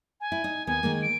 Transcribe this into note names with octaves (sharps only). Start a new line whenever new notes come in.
G#5
E4
D#4
D#2 B3 G#5
D#3 G#3 A#3
D7